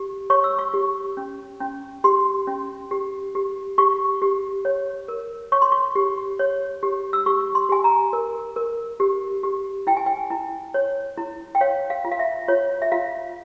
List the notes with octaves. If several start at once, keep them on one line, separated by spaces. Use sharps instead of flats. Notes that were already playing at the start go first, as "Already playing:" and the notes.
Already playing: G4
C#5 C#6
E6
C#6
G4
C#4
C#4
G4 C6
C#4
G4
G4
G4 C#6
G4
C#5
A#4
C#5 C#6
C6
C#6
G4
C#5
G4
E6
G4 C#6
C6
G4 G#5
A#5
A#4
A#4
G4
G4
E4 G5
G#5
G5
E4
C#5
E4
G5
C#5 F5
F5
F4
F5
E5
F4 C#5
E5
F4 F5